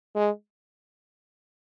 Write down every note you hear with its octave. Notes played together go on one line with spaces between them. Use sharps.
G#3